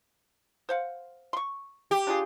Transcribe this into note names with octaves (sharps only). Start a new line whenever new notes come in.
C5 F5 F#5
C6 C#6
G4
D4 F4 G#4